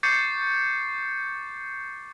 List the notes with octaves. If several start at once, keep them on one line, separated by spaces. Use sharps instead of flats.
C#6 D6 G6 A6 C7 C#7